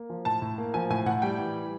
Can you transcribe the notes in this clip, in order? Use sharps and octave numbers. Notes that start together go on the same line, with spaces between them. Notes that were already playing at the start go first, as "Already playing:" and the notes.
Already playing: A#3
F3
A2 A5
A2
A#3
F3 G#5
A2 G#5
A2 F#5
G3 G5
E3